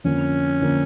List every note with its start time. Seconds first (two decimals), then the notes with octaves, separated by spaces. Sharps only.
0.05 F2 D3 F3 A#3 C#4
0.62 D3 F3 A#3